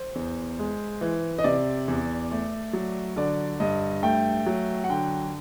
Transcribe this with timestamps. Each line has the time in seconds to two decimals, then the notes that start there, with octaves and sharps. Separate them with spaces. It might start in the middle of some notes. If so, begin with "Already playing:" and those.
Already playing: C5
0.15 E2
0.59 G#3
1.01 E3
1.39 D#5
1.44 C3 D5
1.88 E2
2.31 A3
2.73 F#3
3.16 D3 D5
3.60 G2 D#5
4.03 A3 G5
4.46 F#3
4.84 F#5
4.90 D3 G5